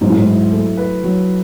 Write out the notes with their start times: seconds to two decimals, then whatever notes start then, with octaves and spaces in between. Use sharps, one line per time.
0.01 G#2 F#3
0.10 A2
0.18 G#2
0.27 E4
0.52 A3
0.77 B4
1.04 F#3